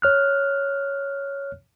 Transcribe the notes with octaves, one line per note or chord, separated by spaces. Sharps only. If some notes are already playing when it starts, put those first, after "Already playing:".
C#5 F6 F#6